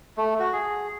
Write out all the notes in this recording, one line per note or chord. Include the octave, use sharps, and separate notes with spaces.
A3
F#4
G#4